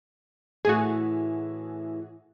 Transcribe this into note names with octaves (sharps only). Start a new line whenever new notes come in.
A2 E3 F#4 G#4